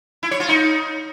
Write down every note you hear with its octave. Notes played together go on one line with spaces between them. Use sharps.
E4
C#5
F4
D#4